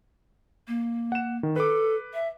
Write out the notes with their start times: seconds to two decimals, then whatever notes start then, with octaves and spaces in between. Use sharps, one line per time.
0.68 A#3
1.12 F#5 E7
1.43 D#3
1.56 A4 B4 D6
2.14 E5